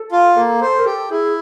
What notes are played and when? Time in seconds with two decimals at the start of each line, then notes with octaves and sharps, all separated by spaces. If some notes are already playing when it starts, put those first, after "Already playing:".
Already playing: A4
0.12 F4
0.37 A#3 A4
0.61 A4 C5
0.79 A#4
0.86 G4 A4
1.11 E4 G#4